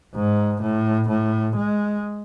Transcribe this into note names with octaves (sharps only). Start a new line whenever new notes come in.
G#2
A2
A2
G#3